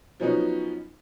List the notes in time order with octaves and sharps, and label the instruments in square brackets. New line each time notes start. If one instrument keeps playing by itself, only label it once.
[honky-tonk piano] F3 F#3 B3 C#4 D#4 B4